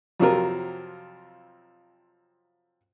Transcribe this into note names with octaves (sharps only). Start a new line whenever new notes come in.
F2 C3 F#3 C4 F4 A#4